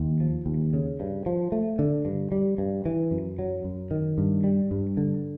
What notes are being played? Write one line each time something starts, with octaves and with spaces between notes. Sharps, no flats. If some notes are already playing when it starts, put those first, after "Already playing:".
Already playing: D#2
F3
D#2
C#3
G2
F3
A3
D3
G2
G3
G2
E3
F#2
F#3
F#2
D#3
G2
G3
G2
D3